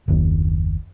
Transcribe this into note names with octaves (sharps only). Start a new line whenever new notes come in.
F#1 D#2